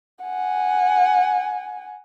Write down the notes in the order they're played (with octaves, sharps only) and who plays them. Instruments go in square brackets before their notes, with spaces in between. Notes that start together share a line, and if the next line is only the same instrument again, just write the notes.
[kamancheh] F#5 G#5